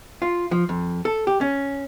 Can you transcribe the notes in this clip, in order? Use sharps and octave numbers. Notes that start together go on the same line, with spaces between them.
F4
F3
F2
A4
G4
C#4